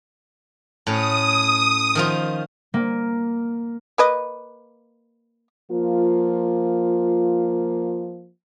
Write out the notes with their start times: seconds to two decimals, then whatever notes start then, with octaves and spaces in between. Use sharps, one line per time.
0.87 A2 C#4 D#6
1.95 D#3 F3 F4
2.74 A#3
3.98 A#3 B4 D#5
5.70 F3 A#3 F4